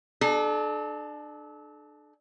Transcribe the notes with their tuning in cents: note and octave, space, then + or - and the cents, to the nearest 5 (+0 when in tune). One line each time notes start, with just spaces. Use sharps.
D4 +30 A4 -35